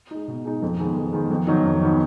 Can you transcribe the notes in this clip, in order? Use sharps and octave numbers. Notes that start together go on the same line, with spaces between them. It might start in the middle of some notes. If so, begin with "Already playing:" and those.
G#3 D#4
B2
G#3 D#4
F2
D#3 G#3 B3
F2
D#3 G#3 B3
F2
D#3 F#3 B3 D#4
F2
D#3 F#3 B3 D#4